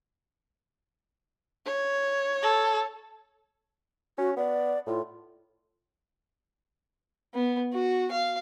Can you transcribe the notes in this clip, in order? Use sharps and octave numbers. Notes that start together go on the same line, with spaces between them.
C#5
A4
C#4 F#4
B3 D5
A2 F4
B3
F#4
F5